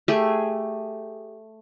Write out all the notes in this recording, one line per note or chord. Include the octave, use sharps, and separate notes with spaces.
A3 G4 G#4